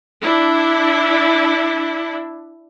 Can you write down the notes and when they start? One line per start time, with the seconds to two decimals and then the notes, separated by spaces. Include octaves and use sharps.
0.21 D4 E4